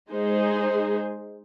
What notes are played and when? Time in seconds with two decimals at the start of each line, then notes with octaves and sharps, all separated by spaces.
0.10 G#3 D#4 G#4 C5